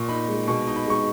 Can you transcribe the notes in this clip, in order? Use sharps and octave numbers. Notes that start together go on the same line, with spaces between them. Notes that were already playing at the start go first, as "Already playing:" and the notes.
Already playing: A#2 C#6
D#4 B5
G#3
B2 C#6
D#4
B5
G#3 C#6